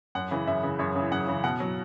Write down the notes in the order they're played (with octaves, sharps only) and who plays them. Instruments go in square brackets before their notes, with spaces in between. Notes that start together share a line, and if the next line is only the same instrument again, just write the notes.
[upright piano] F#2 F#5
C#3 E3
F#2 E5
C#3 E3
F#2 C#5
C#3 E3
F#2 F#5
C#3 E3
B2 F#5
F#3